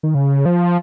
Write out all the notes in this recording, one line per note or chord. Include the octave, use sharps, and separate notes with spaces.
D#3
C#3
F3